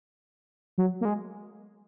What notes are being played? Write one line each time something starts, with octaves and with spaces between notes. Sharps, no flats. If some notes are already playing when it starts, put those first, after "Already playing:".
F#3
A#3
G#3